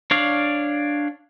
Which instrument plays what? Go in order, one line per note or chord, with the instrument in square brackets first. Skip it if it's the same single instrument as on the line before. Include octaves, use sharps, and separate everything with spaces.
[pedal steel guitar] D4 C#5 D5 F5